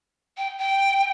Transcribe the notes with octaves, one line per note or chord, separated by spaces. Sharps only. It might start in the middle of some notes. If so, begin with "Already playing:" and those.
G5
G5